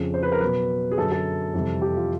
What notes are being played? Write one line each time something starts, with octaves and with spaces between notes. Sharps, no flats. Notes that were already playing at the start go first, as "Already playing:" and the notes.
Already playing: F2 C#3 F3
C5
B4
A#4
B2 F#3 B4
G#4
F#2 D3 F#3 A4
A4
F2 C3 E3 G3
G4
F4